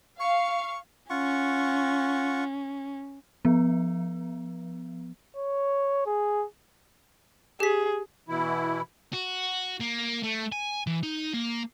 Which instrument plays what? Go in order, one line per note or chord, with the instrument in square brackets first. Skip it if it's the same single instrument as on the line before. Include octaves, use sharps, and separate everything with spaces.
[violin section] F5 [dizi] C#6
[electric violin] C#4 [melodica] F4 F#5 C#6
[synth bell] F3 B3
[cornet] C#5
G#4
[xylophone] G4 B6 [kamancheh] G#4
[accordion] B2 E3 E4
[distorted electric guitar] F#4
A#3
A3
G#5
E3
D#4
A#3